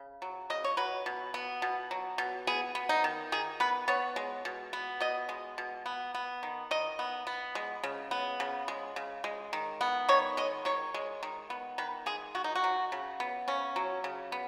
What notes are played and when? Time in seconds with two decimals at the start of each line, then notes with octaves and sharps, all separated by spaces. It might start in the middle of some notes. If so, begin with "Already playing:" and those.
Already playing: C#3
0.22 F#3
0.50 C#3 D#5
0.64 C#5
0.77 F#3 B4
1.06 B2
1.34 B3
1.62 B2
1.91 F#3
2.18 B2
2.47 B3 G#4
2.75 B3
2.89 D#4
3.04 D#3
3.32 D#3 G#4
3.60 B3 B4
3.88 B3 C#5
4.16 G#3
4.45 B2
4.73 B3
5.00 B2 D#5
5.29 G#3
5.58 B2
5.86 B3
6.15 B3
6.43 D#3
6.71 D#3 D#5
6.99 B3
7.27 B3
7.55 G#3
7.83 C#3
8.11 B3
8.40 C#3
8.68 G#3
8.96 C#3
9.24 G#3
9.53 D#3
9.81 B3
10.09 D#3 C#5
10.37 G#3 D#5
10.65 D#3 C#5
10.94 G#3
11.23 D#3
11.50 B3
11.78 D#3 B4
12.06 G#3 G#4
12.35 D#3 F#4
12.44 D#4
12.55 F#4
12.64 F#3
12.92 C#3
13.20 B3
13.48 C#3 C#4
13.76 F#3
14.04 C#3
14.32 B3